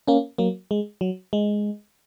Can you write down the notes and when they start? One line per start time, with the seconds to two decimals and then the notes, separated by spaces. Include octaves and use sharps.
0.08 A#3 C#4
0.38 F#3 A#3
0.71 G#3
1.01 F#3
1.33 G#3